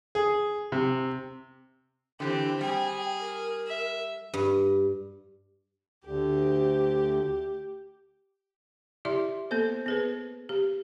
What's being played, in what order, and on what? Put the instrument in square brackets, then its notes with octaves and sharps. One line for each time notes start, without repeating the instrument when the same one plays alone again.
[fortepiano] G#4
C3
[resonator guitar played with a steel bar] D3 E3 [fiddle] C4 G4
[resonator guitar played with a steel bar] G3 [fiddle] G#4 [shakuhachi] G5
[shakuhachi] A#4
[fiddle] E5
[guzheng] G2
[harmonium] D2 [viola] G4
[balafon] E4 G4 D5 E5 C6
A#3 B3 A4 C5
B3 G#4 B4
G4